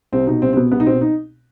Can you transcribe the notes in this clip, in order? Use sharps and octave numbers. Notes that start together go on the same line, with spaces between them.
C2 C4
B2 D#4
C2 C4
C4
B2 B3
C2 B3
D#4
B2 C4
D#4